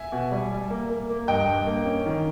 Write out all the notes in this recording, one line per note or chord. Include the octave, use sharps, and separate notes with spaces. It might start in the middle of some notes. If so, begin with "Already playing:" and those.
Already playing: E5 G#5
B2
G3
G3
A#3
A#3
A#3
G2 D#5 G5
G2
A#3
C#4
D#3